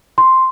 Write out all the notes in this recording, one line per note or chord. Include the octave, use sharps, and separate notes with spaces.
C6